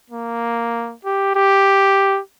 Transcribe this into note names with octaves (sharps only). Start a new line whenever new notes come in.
A#3
G4
G4